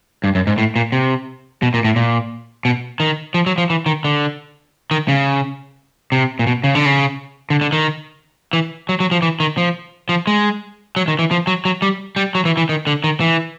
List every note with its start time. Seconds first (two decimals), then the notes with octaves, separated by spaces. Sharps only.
0.24 G2
0.35 F#2
0.47 G#2
0.58 A2
0.76 A#2
0.92 C3
1.62 B2
1.74 A#2
1.85 A2
1.96 A#2
2.65 B2
3.00 D#3
3.34 F3
3.46 F#3
3.58 F3
3.70 E3
3.86 D#3
4.05 D3
4.91 D#3
5.08 C#3
6.12 C3
6.39 A#2
6.47 B2
6.64 C#3
6.75 D3
6.85 C#3
7.50 D3
7.61 D3
7.72 D#3
8.53 E3
8.89 F#3
9.00 F#3
9.11 F3
9.22 E3
9.40 D#3
9.58 F3
10.09 F3
10.27 G#3
10.96 F#3
11.08 D#3
11.19 E3
11.31 F3
11.47 F#3
11.65 F#3
11.82 G3
12.16 G3
12.35 F#3
12.45 E3
12.57 E3
12.69 D#3
12.87 D3
13.04 D#3
13.20 E3